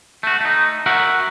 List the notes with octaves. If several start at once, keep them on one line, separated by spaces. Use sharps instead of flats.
A3 F#4
A3 D#4
F#4 A#4 E5 F#5